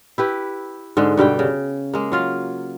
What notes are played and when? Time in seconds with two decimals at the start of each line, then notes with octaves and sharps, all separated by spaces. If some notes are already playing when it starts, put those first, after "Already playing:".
0.18 E4 G4 B4
0.97 G#2 D3 G#3
1.17 G2 B2 G3 G5
1.39 C#3
1.94 G#3 A#3
2.12 F#3 F4 F5